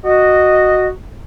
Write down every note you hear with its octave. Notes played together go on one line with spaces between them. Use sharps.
F#4 D#5